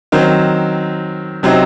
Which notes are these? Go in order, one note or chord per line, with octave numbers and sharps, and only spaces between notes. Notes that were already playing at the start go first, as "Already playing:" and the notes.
D#3 F#3 C4
C3 F#3 C4 D#4